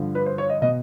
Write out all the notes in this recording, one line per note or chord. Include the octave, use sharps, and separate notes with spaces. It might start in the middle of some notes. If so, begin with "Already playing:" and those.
Already playing: G2 D3 F3
B4
C5
C#5
D#5
B2 D#5